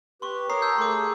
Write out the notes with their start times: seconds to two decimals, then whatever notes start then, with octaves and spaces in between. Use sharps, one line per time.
0.22 G4 B4 C6 C#6
0.50 G4 A#4 C#5 A#5 D#6 C7
0.62 A5 E6 G6
0.78 A3 G#4 A4 C6 D6